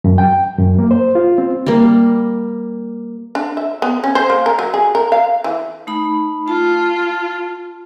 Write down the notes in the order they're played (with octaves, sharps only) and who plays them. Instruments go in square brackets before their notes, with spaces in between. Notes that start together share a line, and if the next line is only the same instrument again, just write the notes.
[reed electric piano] F#2
G5
F#2
A#3
C5
F4
C4
[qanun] G3 A#3
[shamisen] D4
E5
B3
C#4
C5
A#3
A#4
F#3
G#4
A#4
F5
E3
[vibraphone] A3 D#4 B5
[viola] F4 [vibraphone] A5